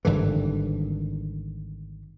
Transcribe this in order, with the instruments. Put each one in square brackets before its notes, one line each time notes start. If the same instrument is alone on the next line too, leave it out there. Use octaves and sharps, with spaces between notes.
[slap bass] G#1 G2 D3 E3